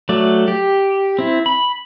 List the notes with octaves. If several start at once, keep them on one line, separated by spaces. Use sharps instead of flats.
F#3 A3 D5
G4
C4 E4
B5